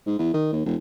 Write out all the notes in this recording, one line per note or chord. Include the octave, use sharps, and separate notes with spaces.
G#2
E2
D#3
D#2
E1